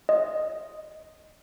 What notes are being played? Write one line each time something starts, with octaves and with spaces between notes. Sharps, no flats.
D#5